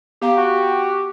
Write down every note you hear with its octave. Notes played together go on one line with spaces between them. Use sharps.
B3 G4 F5 A#5
F#4